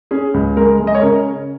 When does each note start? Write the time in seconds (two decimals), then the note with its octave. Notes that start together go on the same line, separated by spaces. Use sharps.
0.11 C#4 G#4
0.34 C#2
0.57 G#3 A#4
0.80 G#3
0.87 D#5
0.95 C#5
1.02 C#3 A#4